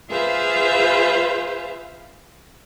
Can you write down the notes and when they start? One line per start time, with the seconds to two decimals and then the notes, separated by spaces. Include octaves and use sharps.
0.11 F4 G#4 B4 C5 E5 F5